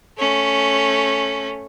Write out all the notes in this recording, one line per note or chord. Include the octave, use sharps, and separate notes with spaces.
A3 C#4